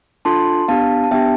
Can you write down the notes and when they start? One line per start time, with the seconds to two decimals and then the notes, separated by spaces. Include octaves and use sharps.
0.25 D4 F4 A4 A5 C6
0.68 B3 D4 G4 F5 A5
1.04 A5
1.11 B3 D4 G4 E5 G5